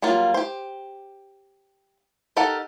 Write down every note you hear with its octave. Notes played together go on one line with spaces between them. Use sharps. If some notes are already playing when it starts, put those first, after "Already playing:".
F#3 G3 A#3 F4
G4 C5
D#4 G4 A4 A#4 F#5